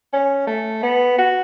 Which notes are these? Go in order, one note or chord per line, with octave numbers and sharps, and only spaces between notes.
C#4
A3
B3
F#4